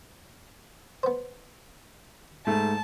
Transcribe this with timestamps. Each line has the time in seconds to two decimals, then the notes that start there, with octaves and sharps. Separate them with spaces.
1.03 B3 C5
2.47 G#2 A3 A5